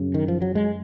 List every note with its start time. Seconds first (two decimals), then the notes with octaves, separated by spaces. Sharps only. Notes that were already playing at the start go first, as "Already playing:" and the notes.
Already playing: F#2 C#3
0.14 D#3
0.28 F3
0.42 F#3
0.55 G#3